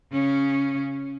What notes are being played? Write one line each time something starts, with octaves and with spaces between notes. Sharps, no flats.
C#3 C#4